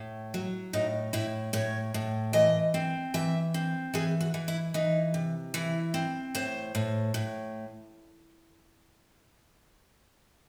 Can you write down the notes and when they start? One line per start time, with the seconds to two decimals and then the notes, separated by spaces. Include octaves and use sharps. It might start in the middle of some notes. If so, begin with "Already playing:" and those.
Already playing: A2
0.34 F#3
0.73 A2 D#4
1.13 A2 E4
1.53 A2 C#5
1.94 A2
2.33 E3 D#5
2.74 C4
3.14 E3 E5
3.54 C4
3.94 E3 G#4
4.21 F#4
4.34 E3
4.48 E4
4.74 E3 D#4
5.14 C3
5.54 E3 E4
5.94 C4
6.35 A2 C5
6.75 A2
7.14 A2